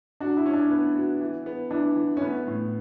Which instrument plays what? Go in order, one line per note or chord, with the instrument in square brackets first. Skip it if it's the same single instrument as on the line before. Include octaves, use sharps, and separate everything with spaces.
[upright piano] D4 [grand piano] F#4
[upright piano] E4
[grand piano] C#4
[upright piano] D4
[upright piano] B3 [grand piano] B4
[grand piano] F#4
E3
B3
[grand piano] E3 [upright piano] D4
[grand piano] E3
[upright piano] C#4
[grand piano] E3 [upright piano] B3
[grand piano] A2